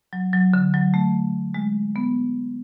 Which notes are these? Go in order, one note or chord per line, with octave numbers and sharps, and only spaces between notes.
F#3
F#3
D3
F#3
A3
G#3
B3